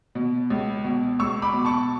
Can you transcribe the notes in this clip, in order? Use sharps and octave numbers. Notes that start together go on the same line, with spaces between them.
B2
C#2
B2
C#2 C#6 E6
B5 D6
B2
A5 C#6